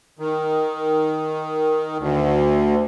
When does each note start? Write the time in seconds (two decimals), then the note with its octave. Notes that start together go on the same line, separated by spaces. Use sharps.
0.19 D#3
1.98 D2